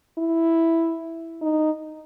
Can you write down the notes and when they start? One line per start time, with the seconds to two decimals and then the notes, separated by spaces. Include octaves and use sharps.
0.18 E4
1.42 D#4